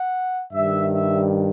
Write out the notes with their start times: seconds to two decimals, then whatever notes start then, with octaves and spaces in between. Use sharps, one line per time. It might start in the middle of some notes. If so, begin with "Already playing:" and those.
Already playing: F#5
0.52 G2 D#3 G3 E5
0.90 E5